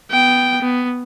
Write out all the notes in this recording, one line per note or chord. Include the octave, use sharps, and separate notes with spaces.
B3 G5
B3